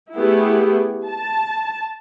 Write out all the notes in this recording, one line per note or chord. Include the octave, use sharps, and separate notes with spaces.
A3 B3 E4 G4 G#4
A5